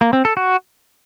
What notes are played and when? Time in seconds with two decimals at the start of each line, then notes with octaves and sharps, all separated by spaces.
0.01 A#3
0.13 C4
0.25 A4
0.37 F#4